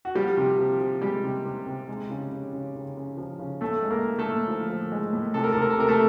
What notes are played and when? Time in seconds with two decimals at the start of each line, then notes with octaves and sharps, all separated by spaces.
0.05 F#4
0.15 F3 G3 G4
0.37 C3
0.58 F3
0.80 F3
1.01 G3 G#3 G4
1.23 C3
1.45 C3
1.66 C3
1.88 G#3
2.10 C#3
2.32 C#3
2.53 C#3
2.75 C#3
2.97 C#3
3.18 F3
3.39 C#3
3.61 A2 A3 A4
3.83 G#3
3.91 A#3 A#4
4.04 G#3
4.19 A3 A4
4.27 A2
4.48 F3
4.69 F3
4.92 G#3
5.13 A2
5.34 C3 A4
5.44 A#4
5.52 A4
5.57 C3 A#4
5.70 A4
5.78 C3 A#4
5.89 A3 A4